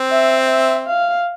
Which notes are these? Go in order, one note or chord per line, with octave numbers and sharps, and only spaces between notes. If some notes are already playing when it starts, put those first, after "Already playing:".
Already playing: C4
E5
E5
F5